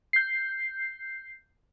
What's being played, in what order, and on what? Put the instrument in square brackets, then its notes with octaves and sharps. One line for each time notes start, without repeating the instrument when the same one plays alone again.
[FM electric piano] G6 C7